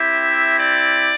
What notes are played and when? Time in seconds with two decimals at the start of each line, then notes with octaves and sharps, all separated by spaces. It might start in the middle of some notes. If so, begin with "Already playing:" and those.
Already playing: C4 E4 G4 E5
0.59 D5